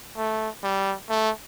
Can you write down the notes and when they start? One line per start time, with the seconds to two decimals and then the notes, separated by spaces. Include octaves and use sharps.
0.17 A3
0.63 G3
1.09 A3